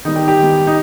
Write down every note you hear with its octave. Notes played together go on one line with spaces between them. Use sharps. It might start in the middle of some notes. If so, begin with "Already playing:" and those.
D#3 G3 B3 D#4
G4
G4
D#3 G3 B3
D#4